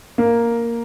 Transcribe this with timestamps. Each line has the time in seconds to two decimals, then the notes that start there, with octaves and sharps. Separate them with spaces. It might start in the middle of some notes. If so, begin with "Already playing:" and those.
0.18 A#3